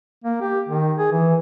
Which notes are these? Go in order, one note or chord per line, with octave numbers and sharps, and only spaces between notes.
A#3
G4
D#3
G#4
E3